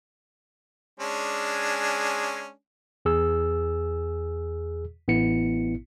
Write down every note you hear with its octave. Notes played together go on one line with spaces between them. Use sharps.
G#3 C#4 D4
E2 G#4 E6
A1 B3 E4 C#7